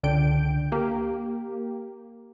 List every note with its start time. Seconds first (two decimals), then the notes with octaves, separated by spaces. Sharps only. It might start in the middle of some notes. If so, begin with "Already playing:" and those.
0.03 C#2 D3 G5 G6 D7
0.72 A#3 G4